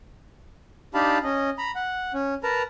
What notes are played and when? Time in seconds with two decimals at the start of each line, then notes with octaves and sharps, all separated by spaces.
0.94 D4 D#4 G4 F5 A5 B5
1.24 C#4 D#5
1.58 A#5 B5
1.75 F#5
2.14 C#4
2.43 A#4 B4 A5 A#5